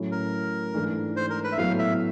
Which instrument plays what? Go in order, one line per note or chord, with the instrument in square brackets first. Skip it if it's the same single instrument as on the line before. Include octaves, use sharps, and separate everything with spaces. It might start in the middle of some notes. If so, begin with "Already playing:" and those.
Already playing: [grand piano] A2 F#3 A3 C#4 E4
[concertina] A#4
[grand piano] G#2 E3 A3 D4
[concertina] C5
A#4
B4
E5
[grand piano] A2 F#3 B3 E4 A4 [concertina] F5
[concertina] E5